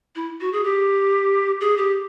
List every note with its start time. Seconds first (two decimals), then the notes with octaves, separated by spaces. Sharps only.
0.16 E4
0.41 F#4
0.53 G#4
0.64 G4
1.61 G#4
1.78 G4